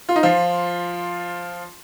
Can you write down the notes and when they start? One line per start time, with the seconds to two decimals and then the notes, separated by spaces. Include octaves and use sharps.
0.09 F4
0.16 D#4
0.23 F3 F4